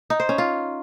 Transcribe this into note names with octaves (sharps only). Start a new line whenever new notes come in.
D#4
C5
C#4
F4